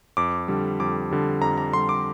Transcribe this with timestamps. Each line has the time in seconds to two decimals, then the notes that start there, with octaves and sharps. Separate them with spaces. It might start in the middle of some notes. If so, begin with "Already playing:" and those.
0.17 F2 D6
0.48 D3 G3
0.80 F2 D6
1.11 D3 G3
1.41 F2 A#5
1.58 A#5
1.73 D3 G3 C6
1.89 D6